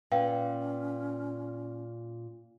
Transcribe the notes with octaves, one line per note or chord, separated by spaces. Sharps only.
A#2 C#4 B4 F5 G5